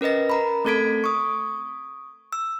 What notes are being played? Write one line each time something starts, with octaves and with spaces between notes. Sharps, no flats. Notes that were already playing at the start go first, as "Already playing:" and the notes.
C#4 A#4 B4 D#5 A#6
A#4 A#5 B5
A3 C4 A4 G#6 B6 D7
C#6 D#6
E6